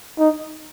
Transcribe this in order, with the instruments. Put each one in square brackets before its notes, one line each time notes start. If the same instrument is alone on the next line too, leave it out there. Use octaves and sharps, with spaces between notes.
[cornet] D#4